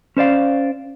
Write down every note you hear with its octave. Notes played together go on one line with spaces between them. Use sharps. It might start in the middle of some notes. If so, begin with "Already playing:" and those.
C#4 C5 D5 F5